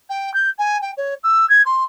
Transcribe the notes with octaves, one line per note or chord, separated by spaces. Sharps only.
G5
G6
G#5
G5
C#5
E6
G#6
C6